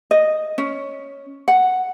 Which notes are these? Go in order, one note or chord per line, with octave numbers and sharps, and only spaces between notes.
D#5
C#4
F#5